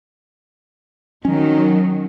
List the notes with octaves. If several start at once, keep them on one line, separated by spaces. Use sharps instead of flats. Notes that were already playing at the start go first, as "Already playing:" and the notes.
D#3 F#3 C#4